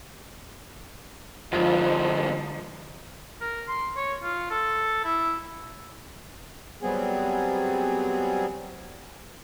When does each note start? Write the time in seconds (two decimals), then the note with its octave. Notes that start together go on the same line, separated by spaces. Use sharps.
1.53 F2 G#2 D3 F3 D#4 F4
3.41 A#4
3.68 C6
3.96 C#5
4.23 F4
4.50 A4
5.04 E4
6.82 F#3 G3 B3 C4 G#4